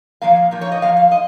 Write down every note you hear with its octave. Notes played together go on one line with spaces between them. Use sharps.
A#2 F3 A#3 F5
A#2 F3 A#3
C#5
D#5
F#2 F3 A#3 F5
F5
D#5